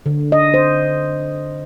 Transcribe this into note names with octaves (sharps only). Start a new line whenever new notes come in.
D3
D#5
C5